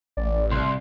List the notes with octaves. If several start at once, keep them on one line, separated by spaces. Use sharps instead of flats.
A1 D5
C2 C6